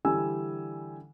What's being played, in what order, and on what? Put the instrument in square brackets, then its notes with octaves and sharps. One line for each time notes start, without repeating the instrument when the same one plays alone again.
[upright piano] D3 E3 G3 G#5 E6